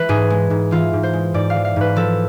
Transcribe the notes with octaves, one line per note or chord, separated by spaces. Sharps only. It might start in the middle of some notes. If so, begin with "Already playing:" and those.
Already playing: E3 G#3 B4
G#2 G#4
G#3
G#2
E3 F4
G#2
C5
G#3
G#2 D5
F5
E3
F5
G#2 B4
F3 A4